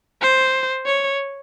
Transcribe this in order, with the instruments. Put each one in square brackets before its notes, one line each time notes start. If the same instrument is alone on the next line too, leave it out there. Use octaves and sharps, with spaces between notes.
[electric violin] C5
C#5